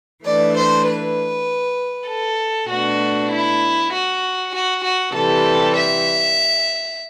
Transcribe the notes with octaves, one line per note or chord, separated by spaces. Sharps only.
E3 A3 D4 D5
C5
B4
A4
B2 A3 D4 F#4
E4
F#4
F#4
F#4
C3 E3 G3 A4
E5